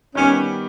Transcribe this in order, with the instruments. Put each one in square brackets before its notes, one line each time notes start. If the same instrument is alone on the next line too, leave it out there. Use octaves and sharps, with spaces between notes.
[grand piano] D#3 G3 B3 [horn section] C#4